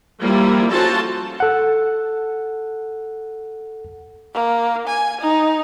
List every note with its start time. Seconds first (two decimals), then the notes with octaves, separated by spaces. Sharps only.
0.20 F3 G3 A#3 E4
0.71 C#4 F4 F#4 A4 C5 A5
1.40 A4 F#5
4.34 A#3
4.87 G#5
5.21 D#4